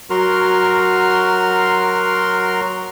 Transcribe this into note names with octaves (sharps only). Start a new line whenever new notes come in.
F#3 F#4 A#4 C6 F6